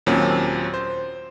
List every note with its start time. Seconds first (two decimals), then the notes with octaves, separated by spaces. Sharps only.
0.06 D#2 A#2 F#3 C4 C#4
0.74 C5